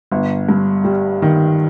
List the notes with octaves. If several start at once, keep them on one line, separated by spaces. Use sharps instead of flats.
G1
G2
G3
D#3